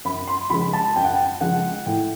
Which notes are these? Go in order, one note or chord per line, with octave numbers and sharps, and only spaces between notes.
F#2 B5
C6
C#3 F3 G#3 B5
A5
F#2 G5
F#5
G5
C#3 F3 G#3 F#5
A2 G5